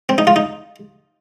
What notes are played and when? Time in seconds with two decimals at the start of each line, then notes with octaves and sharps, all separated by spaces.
0.09 C4
0.18 D#4
0.27 F4
0.36 D#4